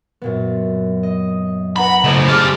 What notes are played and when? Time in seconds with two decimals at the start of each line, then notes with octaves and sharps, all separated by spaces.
0.22 F#2 A#2 B3
1.03 D#5
1.76 D4 B4 F#5 A#5 B5
2.04 A2 C#3 A4 C5 D5 D#5 B5
2.28 G3 G#4 A5 D6 F6